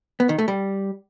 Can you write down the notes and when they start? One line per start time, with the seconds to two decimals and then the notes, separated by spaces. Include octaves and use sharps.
0.20 B3
0.29 D#3
0.38 A3
0.48 G3